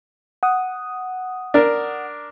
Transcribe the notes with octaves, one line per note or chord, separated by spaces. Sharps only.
F#5 D#6
D4 A#4